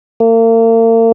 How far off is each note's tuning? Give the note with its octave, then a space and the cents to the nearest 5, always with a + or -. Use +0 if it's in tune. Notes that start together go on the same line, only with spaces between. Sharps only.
A#3 -40